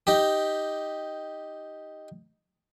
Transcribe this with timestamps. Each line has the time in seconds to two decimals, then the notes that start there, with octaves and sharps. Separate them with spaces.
0.07 D#4 G4